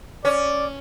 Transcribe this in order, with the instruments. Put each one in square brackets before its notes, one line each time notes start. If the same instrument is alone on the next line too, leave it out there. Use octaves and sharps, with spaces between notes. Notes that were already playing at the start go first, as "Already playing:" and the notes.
[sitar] C#4 [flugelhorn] D5